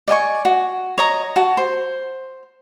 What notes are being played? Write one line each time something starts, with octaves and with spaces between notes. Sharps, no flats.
D5 D#5 G#5 C#6
F#4
C#5 D#5 A#5
F#4 A5
C5